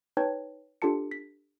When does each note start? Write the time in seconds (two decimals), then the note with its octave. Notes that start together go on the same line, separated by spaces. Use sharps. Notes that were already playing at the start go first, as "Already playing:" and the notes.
0.17 D#4 B4 C#5 G5 A5 G#6
0.82 D4 F4 G4 A4 A5 C#7
1.11 B6